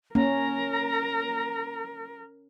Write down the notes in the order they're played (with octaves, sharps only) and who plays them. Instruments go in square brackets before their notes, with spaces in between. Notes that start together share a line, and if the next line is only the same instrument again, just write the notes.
[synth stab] A#3 [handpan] C#4 [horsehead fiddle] A#4 [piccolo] A#5